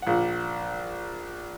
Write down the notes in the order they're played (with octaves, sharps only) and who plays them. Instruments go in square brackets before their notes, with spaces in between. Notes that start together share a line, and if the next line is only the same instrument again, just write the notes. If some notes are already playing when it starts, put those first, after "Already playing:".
[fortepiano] A#1 F#5